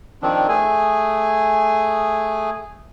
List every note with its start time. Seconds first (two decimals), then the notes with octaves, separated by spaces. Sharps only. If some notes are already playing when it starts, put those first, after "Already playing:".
0.22 D#3 F3 C4 D4
0.49 A3 G#4 G#5